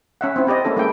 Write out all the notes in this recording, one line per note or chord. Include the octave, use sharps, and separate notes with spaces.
C#4 E5 F#5
C4 E4
C4 G4 D5 D#5
A#3 C#4 E4 A4
G#3 E4 G5